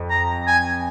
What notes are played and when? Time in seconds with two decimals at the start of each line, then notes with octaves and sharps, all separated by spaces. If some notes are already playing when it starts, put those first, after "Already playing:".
Already playing: F2
0.10 A#5
0.47 G#5